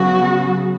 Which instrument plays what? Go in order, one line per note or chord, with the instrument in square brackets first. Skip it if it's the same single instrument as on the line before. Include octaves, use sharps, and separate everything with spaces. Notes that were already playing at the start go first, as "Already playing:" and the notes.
Already playing: [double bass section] C#3 F#3 B3 [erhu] F#4